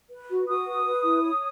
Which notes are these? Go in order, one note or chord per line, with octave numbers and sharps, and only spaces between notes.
B4
F#4
F#4 D#6
B4
B4
E4
C#5